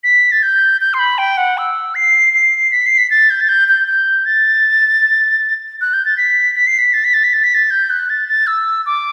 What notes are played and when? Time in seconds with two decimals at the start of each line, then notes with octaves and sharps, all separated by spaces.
0.04 B6
0.32 A6
0.43 G6
0.81 G6
0.94 C6
0.99 B5
1.18 G5
1.37 F#5
1.58 E6
1.95 C7
2.34 C7
2.72 B6
2.86 C7
2.98 B6
3.10 A6
3.30 G6
3.41 A6
3.49 G6
3.68 G6
3.88 G6
4.25 A6
5.81 F#6
5.93 G6
6.05 A6
6.17 B6
6.56 B6
6.67 C7
6.78 B6
6.93 A6
7.04 B6
7.14 A6
7.24 B6
7.34 A6
7.44 B6
7.54 A6
7.71 G6
7.90 F#6
8.10 A6
8.29 A6
8.47 E6
8.86 D6